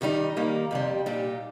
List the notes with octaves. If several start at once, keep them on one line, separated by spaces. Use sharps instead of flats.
G2 D#3 G3 D#4
D#2 D#3 G3 A#3
F2 C3 G3
A#2 G3 D#4 G4